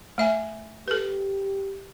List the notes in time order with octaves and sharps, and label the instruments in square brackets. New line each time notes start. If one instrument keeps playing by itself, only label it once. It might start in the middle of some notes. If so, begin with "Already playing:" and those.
[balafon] A3 E5 G#5
[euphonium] G4 [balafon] A4 B4